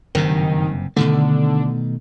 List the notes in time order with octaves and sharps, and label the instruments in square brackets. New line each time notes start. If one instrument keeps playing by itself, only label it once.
[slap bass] F#1 G2 C3 [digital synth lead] D#3
[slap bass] B2 D#3 A3 [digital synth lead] D3